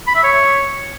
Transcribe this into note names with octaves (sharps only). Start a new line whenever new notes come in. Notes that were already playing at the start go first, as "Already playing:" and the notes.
B5
E5
C#5